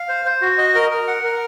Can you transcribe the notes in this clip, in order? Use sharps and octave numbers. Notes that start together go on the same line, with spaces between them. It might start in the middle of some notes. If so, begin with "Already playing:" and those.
Already playing: F5
C5
C5
F#4
D#5
A#4
A#4
F#5
A#4